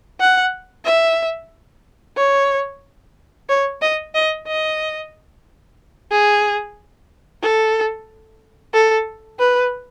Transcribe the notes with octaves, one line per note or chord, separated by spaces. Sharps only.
F#5
E5
C#5
C#5
D#5
D#5
D#5
G#4
A4
A4
B4